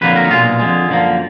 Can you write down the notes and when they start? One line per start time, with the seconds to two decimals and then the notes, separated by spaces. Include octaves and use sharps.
0.01 F2 D3 F#3 A#3 B4
0.16 A#4
0.25 D#4
0.30 B1 A#2 G#3 F4
0.60 F2 D3 G#3
0.89 F#2 D3 F3 A#3